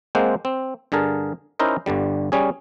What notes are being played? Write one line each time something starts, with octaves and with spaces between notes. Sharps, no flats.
G#3 A#3 C4 C5 F#5
C4
G2 D3 G#4 A#4 A5
C#4 D#4 E4 A#4 C5 D#5
G1 G2 D3 G3
G3 C#4 G#4